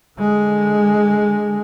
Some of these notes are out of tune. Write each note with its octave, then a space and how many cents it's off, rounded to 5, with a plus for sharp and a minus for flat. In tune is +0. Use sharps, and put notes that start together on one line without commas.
D3 +0 G#3 +0